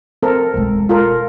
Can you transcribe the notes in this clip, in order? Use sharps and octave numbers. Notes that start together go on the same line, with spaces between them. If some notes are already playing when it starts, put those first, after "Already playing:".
C4 A4 A#4
E1 G#3
F4 A4 A#4